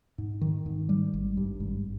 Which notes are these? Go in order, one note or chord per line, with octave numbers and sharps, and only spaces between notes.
G#2
D#3
G#2
G3
G#1
G2
G#1